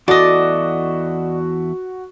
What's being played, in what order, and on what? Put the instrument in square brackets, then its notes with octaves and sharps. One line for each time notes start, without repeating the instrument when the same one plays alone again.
[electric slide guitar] E2 E4 A4 [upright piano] F#4 [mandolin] D5 D#5